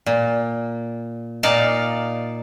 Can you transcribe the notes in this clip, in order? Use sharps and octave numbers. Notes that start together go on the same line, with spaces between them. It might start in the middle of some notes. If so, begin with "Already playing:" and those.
A#2
A#2 D#4 D5 F5 A5